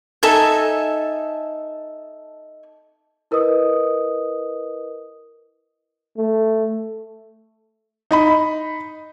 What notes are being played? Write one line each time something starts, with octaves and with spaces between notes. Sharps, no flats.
D#4 A4 E5 G#5
E4 A#4 B4 D#5 D#6
A3
D#4 D#5 B5